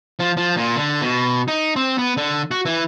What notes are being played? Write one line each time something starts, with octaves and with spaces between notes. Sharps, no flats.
F3
F3
A#2
D3
B2
D#4
C4
B3
D3
F#4
E3